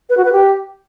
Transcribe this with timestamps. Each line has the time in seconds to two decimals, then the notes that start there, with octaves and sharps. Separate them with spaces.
0.09 B4
0.17 F#4
0.25 B4
0.32 G4